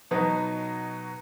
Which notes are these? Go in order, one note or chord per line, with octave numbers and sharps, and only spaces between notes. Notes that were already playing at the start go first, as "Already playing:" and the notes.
B2 F#3 B3 D#4